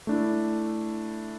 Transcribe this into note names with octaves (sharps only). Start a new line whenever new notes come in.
A3 D4 E4